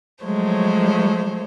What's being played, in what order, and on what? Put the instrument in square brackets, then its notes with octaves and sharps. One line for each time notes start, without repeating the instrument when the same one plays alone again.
[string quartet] F3 F#3 G#3 A3 C5 C#5